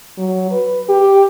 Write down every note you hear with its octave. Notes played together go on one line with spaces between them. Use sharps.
F#3
B4
G4